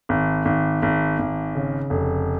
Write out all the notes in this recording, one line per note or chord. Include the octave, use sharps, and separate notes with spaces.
G#1
G#1
G#1
G#1
C#3
F1